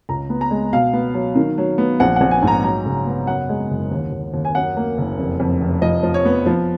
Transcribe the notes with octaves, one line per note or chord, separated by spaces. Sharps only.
C#2 A#5
B3
A#5
G#3
B2 F5
B3
F#3
D#3
F#3
B3
A#1 F#5
A#1 F#5
G#5
G#2
A#5
F#3 A#5
C#3
B3
F#2 F#5
G#3
F#1
D#2
D#2
D#2
G#5
F#2 F#5
A#3
F#1
F1
F2
F1
F3 D#5
F3
C#5
B3
F3